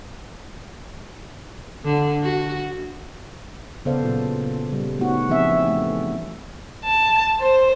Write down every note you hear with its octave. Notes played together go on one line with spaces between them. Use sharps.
D3
F#4
C#3 B3 A4 C5 D5 F5
A#2 F#3 F4
C#3 G3
A3 B3 C#4 D#4 F#4
E3 F3 C4 G#4 E5
A3 C#4 D#4
A5
C5